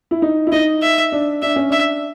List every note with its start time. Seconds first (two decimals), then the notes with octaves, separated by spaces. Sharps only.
0.11 E4
0.22 D#4
0.47 E4
0.52 D#4 D#5
0.82 E5
1.12 D4
1.42 D4 E5
1.56 C#4
1.69 D4 E5